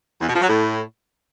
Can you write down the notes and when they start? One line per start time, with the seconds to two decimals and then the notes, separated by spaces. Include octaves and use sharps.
0.21 E2
0.28 B2
0.35 F3
0.42 F#3
0.49 A2